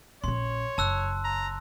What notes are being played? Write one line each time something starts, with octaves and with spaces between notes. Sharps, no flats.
A#1 C#4 C#5 C6
F#1 A5 E6 F#6
A#5